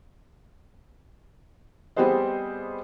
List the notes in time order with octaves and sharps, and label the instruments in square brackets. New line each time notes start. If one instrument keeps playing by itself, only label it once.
[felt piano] G3 B3 C4 G#4 C5 D#5